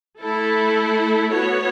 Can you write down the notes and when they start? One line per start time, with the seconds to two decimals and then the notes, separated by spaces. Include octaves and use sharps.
0.20 A3 E4 A4
1.32 B3 F#4 C#5